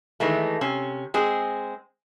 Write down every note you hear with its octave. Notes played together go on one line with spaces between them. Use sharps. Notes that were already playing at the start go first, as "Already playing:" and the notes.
D#3 E3 G#3 A3
C3 C#4
G#3 C4 G#4